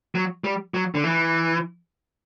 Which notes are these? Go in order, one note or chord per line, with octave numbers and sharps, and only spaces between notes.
F#3
G3
F#3
D3
E3